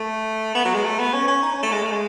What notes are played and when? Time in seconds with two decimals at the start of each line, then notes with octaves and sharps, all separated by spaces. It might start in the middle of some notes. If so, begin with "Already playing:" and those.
Already playing: A3
0.55 B3
0.65 F#3
0.75 G#3
0.84 A3
0.99 B3
1.13 C#4
1.28 C#4
1.42 D#4
1.53 C#4
1.63 A3
1.72 G#3
1.82 A3
1.91 G#3